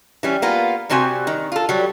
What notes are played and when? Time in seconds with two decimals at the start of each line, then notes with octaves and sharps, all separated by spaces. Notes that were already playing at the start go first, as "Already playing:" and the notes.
0.23 E3 G3 C#4
0.42 A#3 B3 F4
0.90 C3 G3 C4 F#4 G#5
1.27 D#3
1.52 F4 A4
1.69 F#3 G3